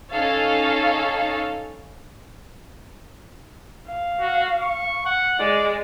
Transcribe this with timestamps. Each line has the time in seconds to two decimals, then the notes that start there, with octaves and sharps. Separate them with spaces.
0.11 C#4 D#4 A4 C#5 F5 A6
3.88 F5
4.20 F#4
4.61 C#6
5.06 F#5
5.39 G#3 D5